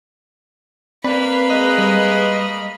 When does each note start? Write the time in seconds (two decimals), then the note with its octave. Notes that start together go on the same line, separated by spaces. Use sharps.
1.04 A#3 C4 B4 D5 B5
1.50 G#3 B4 D#5
1.78 G3